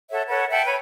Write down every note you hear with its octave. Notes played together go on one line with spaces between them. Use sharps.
A4 C#5 E5 F#5
A4 B4 C#5 F#5
E5 F#5 G5 A5
B4 C#5 B5